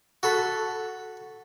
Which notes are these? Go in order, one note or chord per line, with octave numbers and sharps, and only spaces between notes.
F#4 A4 B5